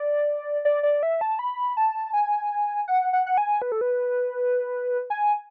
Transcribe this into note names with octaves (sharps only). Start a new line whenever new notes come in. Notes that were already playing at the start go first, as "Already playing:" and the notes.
Already playing: D5
D5
D5
E5
A5
B5
A5
G#5
F#5
F#5
F#5
G#5
B4
A4
B4
G#5